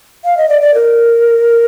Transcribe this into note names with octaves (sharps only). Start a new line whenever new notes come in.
F5
D#5
D5
D5
A#4